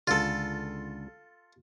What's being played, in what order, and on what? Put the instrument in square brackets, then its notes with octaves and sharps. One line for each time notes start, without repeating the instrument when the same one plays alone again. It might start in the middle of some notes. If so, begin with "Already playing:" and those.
[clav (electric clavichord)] C#2 D3 [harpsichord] F4 A4